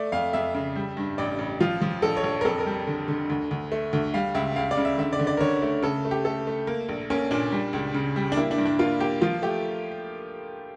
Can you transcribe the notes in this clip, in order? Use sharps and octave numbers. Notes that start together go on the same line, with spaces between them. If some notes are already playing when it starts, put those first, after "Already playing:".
Already playing: A3 D5
F2 F5
F2 E5
C#3
G3
G2
A1 D5
A1
F3 F4
F3
A#1 A4
C#5
A#1
A#4
F2 A4
A#4
G3
D3
D3
D2
D2
A3
D2
G3 F5
C#2 E5
C#2 F5
D5
C#3
E5
D3 E5
D5
D3
D5
A#4
D3 C#5
A3
C#3 A4
A3
G4
A3 A4
A3
A#3
A#1
A#3 C#4
A#2 D4
G3
C#2
C#3
G3
D4
A#3 E4
D4
G2
D4
A#3 F4
A#3 G4
F3 F4
A3 G4